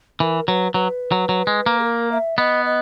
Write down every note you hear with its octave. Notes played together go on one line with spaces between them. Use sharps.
E3 A#4
F#3 B4
F#3 B4
F#3
F#3
G#3
A#3
G#4
A#4
E5
B3 D#5
D#5